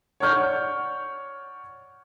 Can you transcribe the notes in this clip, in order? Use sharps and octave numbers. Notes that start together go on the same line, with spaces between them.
C#5 D5 F#5 C#6 F6 G6